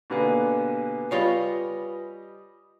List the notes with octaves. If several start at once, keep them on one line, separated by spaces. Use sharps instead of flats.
B2 D3 A#3 G4 B4 G#5
G3 F4 C#5 D#5 F5 B5